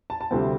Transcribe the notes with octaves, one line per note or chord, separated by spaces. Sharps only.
A5
A5
D2 C3 G3 C4 E4